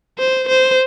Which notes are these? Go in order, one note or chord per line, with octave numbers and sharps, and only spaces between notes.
C5
C5